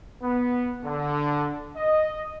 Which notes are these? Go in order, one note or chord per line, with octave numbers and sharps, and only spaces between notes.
B3
D3
D#5